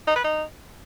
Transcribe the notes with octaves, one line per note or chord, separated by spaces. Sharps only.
D#4
B4
D#4